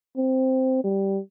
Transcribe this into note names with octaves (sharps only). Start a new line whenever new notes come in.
C4
G3